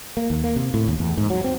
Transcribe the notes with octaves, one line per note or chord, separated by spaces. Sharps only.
A#3
D#2
A#3
C3
A2
D#2
E2
G#2
F#3
C4